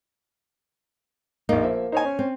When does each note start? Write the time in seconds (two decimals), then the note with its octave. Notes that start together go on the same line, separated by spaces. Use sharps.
1.49 A#1 A#3 D#4
1.63 F3 E5
1.92 D#4 C5 C#5 G#5
2.05 C#4
2.19 C4